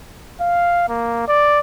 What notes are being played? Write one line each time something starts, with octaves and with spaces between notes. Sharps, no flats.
F5
A#3
D5